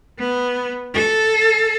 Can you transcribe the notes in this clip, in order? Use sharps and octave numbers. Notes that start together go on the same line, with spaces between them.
B3
A4